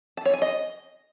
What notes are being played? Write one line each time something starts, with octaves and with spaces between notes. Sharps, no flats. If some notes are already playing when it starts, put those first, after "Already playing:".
A5
C#5
G#5
D#5